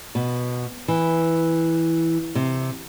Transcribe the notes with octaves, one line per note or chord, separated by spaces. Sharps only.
B2
E3
C3